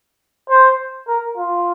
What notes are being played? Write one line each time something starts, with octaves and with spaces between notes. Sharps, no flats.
C5
A#4
F4